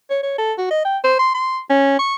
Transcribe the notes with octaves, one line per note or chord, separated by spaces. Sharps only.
C#5
C#5
A4
F#4
D#5
G5
C5
C6
C6
C#4
C#6